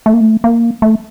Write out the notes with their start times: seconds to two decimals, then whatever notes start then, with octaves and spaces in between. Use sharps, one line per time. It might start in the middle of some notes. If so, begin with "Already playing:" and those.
0.06 A3
0.14 A#3
0.21 A3
0.44 A#3
0.82 A3